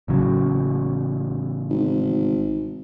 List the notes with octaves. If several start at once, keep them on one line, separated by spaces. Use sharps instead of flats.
A1 C#3 F#3
G#1